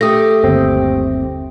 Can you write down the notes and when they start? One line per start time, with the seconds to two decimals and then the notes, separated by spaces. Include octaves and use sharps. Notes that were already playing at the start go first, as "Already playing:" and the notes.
0.01 A3 G4 D#6 A#6
0.43 G1 D#2 C4